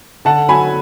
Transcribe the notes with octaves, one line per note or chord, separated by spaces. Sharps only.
D3 F#5 A5
F#3 G#5 B5